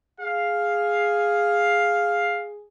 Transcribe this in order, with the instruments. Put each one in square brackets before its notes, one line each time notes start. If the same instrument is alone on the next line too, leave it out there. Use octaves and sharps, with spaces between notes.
[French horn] G#4 [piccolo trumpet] F5